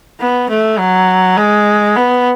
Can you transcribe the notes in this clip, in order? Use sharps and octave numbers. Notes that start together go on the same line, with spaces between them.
B3
A3
F#3
G#3
B3